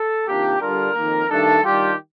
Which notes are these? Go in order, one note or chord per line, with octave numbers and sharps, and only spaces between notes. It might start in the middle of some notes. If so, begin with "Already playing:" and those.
Already playing: A4
C3 D#3 A#3 D4 F4 G4
D3 G3 D4 F4 A#4
F2 D#3 A#3
G2 D#3 A3 D4 A4
D#3 G3 D4 F4 G4